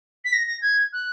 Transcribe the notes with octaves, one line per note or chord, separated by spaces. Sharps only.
B6
A#6
A#6
G#6
F#6